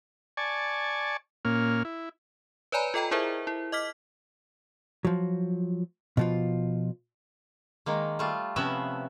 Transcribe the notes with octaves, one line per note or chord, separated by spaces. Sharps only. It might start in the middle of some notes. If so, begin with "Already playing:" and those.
D5 G#5 A5 C#6
A#2 A#3 C#4 F6
E4
B4 C#5 D5 G#5 A#5 B5
F4 A4 D#5 G5 A#5
E4 G#4 A#4 C5 E5
E4
D#5 D6 F6 B6
F3 F#3
B2 F3 F4
D#3 G#3 A#3
G3 A3 F4
C3 F3 B3 C#4 B4 E5